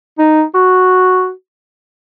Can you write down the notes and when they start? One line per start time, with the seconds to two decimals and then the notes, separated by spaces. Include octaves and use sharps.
0.18 D#4
0.54 F#4